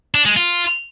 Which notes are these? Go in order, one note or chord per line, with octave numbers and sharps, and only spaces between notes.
D4
G#3
F4